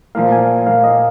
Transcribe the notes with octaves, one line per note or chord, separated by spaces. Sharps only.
A#2 F3 A#3 F5
G#5
A#2 F3 A#3 F5
D#5